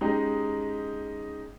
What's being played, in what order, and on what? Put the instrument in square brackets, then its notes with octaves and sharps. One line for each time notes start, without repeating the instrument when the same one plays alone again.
[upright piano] G#3 C#4 D#4 G4